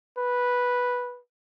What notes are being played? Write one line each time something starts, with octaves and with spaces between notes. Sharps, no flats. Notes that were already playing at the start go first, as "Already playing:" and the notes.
B4